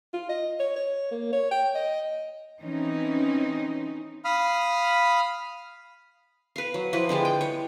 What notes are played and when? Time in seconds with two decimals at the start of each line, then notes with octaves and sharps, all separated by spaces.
0.13 F4
0.29 D#5
0.59 C#5
0.76 C#5
1.11 A#3
1.33 C#5
1.51 G5
1.75 D#5
2.62 E3 C4 C#4 D#4
4.25 F5 B5 D#6 F6
6.56 B4 F5
6.74 F#3
6.93 F3 E4 B4
7.09 D3 G3 G#3 D5
7.25 G5
7.41 C#5